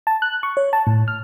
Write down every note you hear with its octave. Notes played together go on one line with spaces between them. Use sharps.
A5
F#6
C#6
C#5
A5
A2
F6